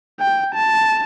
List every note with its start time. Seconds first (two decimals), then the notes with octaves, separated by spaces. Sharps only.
0.20 G5
0.55 A5